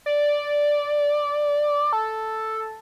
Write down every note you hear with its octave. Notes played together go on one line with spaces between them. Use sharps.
D5
A4